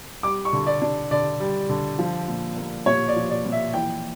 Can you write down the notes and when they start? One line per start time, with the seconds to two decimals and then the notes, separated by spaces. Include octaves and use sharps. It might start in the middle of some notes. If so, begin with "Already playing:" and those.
0.23 G3 D6
0.45 C#6
0.53 D3
0.67 D5
0.82 D4
1.11 D3 D5
1.40 G3
1.69 D3
1.99 F3
2.28 A#2
2.57 A#3
2.86 A#2 C#5
3.08 D5
3.16 F3
3.30 D5
3.45 A#2
3.52 E5
3.74 E3 G5